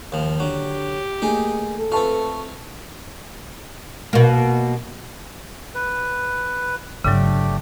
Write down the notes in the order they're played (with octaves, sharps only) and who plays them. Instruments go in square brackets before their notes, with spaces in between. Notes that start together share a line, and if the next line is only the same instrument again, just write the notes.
[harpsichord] D#2 F3
[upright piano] D3 [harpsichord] F#3 [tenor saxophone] G4
[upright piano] A3 A#3 [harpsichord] D#4 G#4
[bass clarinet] A4
[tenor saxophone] A3 [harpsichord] C4 F4 [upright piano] B4 A5 C#6
[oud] B2 A#3
[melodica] B4
[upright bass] G1 [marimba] C#3 F#3 [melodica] A3 D4 G4